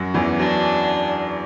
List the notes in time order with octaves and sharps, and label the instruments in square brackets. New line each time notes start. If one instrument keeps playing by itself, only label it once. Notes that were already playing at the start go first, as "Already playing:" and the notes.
Already playing: [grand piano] F#2 F#3
E2 E3
[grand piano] F#2 F#3 [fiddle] D4